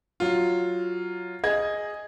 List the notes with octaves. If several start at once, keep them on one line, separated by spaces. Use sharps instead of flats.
F#3 F4
G#4 D#5 G#6